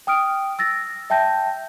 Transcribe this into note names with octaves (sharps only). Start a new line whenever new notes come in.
G5 D#6 F6 D7
E6 A6 A#6
E5 G5 A5 G6 A#6